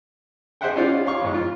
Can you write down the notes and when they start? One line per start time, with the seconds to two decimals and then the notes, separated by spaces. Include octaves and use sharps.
0.61 G#4 C5 D#5 E5 F#5 G5
0.76 C#4 D#4 F4 G#4 D5 F5
1.06 C#5 F5 C6 C#6
1.21 F2 G#2
1.34 F4